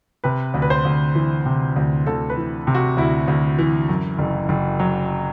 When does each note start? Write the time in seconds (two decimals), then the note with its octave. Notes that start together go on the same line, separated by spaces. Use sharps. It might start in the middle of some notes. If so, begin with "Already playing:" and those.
0.24 C3 B4
0.54 D2
0.62 B4
0.70 C5
0.85 D2
1.15 E3
1.46 C3
1.76 D2
2.07 D2 A4
2.30 B4
2.37 E3
2.67 C3
2.75 F#4
2.97 D2 E4
3.28 D2
3.59 E3
3.89 F#2
4.19 F#1
4.49 F#1
4.80 F#3